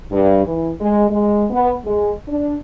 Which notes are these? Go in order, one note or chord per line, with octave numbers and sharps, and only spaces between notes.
G2
E3
G#3
G#3
B3
G#3
D4